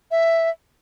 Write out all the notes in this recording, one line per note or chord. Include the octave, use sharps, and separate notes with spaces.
E5